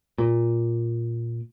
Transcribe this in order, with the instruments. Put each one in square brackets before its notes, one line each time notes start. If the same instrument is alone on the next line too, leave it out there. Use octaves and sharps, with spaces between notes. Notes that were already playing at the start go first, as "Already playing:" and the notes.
[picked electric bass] A#2